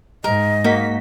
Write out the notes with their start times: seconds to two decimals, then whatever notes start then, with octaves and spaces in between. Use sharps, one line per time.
0.24 G#2 A#4 D#5
0.64 A#3 D#4 F#4 B6